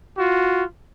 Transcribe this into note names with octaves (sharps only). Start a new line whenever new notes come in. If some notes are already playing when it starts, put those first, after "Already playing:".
F4 F#4